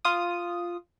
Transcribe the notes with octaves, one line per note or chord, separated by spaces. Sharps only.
F4 D#6